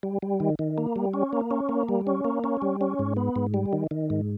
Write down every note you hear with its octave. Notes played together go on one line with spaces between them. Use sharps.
G3
G3
D#3
D#3
A#3
G3
C#4
A#3
C#4
A#3
G3
C#4
A#3
C#4
G3
C#4
G#2
B3
G#2
G3
D#3
D#3
G#2